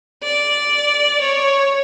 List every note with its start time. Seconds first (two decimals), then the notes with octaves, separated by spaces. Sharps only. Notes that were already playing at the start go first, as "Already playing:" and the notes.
0.23 D5
1.21 C#5